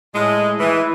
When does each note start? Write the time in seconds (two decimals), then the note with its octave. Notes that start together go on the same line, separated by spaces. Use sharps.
0.14 A2 G#3
0.59 E3